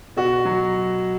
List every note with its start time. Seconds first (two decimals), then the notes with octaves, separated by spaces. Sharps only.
0.17 B2 F#4
0.45 F#3